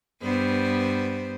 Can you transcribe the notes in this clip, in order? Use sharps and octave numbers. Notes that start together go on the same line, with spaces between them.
G2 B3 C5